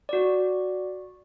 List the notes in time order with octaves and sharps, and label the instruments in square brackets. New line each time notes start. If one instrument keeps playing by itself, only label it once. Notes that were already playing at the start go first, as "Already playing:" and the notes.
[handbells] F#4 D5